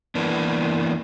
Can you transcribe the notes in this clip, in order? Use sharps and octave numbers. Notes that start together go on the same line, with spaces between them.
E3 A#3 B3 D4